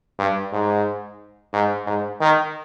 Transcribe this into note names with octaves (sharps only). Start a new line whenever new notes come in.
G2
G#2
G#2
G#2
D#3